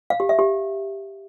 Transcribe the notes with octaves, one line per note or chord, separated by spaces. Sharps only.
F5
G4
E5
G4